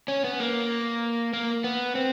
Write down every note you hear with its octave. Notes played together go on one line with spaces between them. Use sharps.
C#4
B3
A#3
A#3
B3
C4